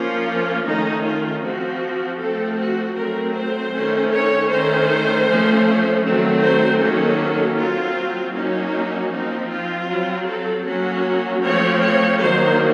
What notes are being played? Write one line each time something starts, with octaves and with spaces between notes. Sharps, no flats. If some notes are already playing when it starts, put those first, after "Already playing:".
Already playing: F3 A#3 C#4 F4
D#3 A3 C#4 D#4
F4
F3 C4 F#4
F3 A3 C4 A4
F#4
F#3 A3 C4 A#4
C5
D#3 A3 C#4
C#5
D#3 A3 C#4 C5
F3 A3 C#4
D#3 F#3 A3 C4
C5
D#3 F#3 A#3 C#4 A4
F#3 C4 F4
F#3 A#3 C#4 D#4
F3 C4 D#4
F4
F#3 C4
A4
F#3 A#3 C#4 F#4
F3 A3 C4 C#5
C#5
D#3 F#3 A#3 C5